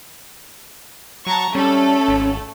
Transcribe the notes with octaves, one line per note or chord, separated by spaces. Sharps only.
F#3 A5 A#5 C#6
G3 A3 C#4 A4
G#1